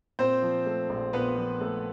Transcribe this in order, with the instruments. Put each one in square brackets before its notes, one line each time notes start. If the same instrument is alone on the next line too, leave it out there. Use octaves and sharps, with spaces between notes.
[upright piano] A#2 C4 C5
F3
A3
A#1
A#2 B3 B4
F3
A3